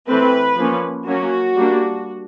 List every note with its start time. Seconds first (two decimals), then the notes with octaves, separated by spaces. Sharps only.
0.08 E3 A3 C4 B4
0.58 F3 A#3 C#4
1.07 F#3 A#3 C#4 F#4
1.57 G3 A#3 D4